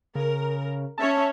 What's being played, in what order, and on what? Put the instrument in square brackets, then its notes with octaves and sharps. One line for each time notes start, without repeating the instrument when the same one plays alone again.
[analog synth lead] C#3 [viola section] A#4
[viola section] C#4 C#5 E5 [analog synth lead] A5